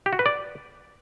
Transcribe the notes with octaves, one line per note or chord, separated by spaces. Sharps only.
G4
F#4
B4
D5